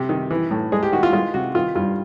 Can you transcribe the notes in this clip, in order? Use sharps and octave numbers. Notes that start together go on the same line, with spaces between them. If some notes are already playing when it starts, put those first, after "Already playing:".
Already playing: C3 G4
D#3
E3
A2
G#3 G#4
G4
D#3 F#4
F4
G#3 F4
C3 F#4
D#3 F4
G2 F4